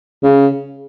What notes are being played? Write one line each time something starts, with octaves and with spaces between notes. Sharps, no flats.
C#3